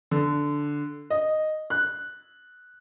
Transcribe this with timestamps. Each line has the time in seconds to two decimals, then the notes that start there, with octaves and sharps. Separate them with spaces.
0.11 D3
1.10 D#5
1.70 F#6